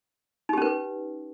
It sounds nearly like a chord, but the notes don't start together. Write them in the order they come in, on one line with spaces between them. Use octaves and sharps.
D#4 G4 C#4 B4